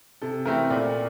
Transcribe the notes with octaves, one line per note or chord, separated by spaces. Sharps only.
C3 A4
E3 A3 C4 A#4
A#2 D5